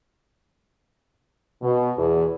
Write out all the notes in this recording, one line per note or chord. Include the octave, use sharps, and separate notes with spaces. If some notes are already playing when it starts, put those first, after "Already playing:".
B2
E2